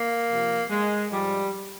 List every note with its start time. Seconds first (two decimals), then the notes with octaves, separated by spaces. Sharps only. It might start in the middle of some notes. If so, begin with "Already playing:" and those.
Already playing: A#3
0.29 C3 F3
0.70 G#3
1.10 G#2 F3 G3